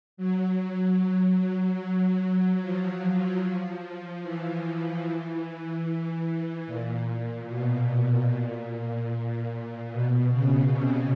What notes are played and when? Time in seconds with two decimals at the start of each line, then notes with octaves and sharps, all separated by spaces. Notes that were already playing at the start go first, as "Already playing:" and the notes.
0.17 F#3
1.80 F#3
2.61 F3
4.23 E3
6.67 A#2
7.48 B2
8.29 A#2
9.91 B2
10.31 C#3
10.72 C3